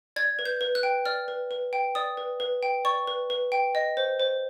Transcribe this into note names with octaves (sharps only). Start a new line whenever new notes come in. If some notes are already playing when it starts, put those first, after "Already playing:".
D5 G#6
B4
G6
B4
F#6
G5
D5 F6
B4
B4
G5
D5 D#6
B4
B4
G5
D5 C#6
B4
B4
G5
D#5
C5
C5